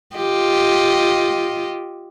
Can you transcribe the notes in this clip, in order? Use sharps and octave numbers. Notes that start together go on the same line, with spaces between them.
F4 G4 D#5